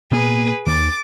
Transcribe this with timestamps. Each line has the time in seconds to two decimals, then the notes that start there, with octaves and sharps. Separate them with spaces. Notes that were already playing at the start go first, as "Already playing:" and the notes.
0.12 A#2 A#3 B3 G#4 B4
0.67 D#2 D#3 D6 A6